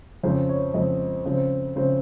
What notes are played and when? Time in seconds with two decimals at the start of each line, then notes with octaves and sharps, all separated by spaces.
0.23 F2 C#3 F3 C4 C5
0.49 C#5
0.74 F2 C#3 F3 C4 D#5
1.25 C#3 F3 C4
1.76 C#3 F3 C4 C5